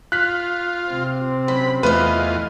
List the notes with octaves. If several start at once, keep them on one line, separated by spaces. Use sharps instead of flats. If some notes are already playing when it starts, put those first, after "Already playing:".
F4 F#6 B6
C3 C4
F#2 B5
E2 A3 F4 B4 D#5